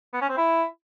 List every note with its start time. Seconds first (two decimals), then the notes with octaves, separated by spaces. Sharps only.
0.13 B3
0.21 C#4
0.29 C4
0.37 E4